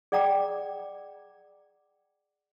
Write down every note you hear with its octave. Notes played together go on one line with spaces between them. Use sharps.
G#4 D5 F#5 G5 A#5 D6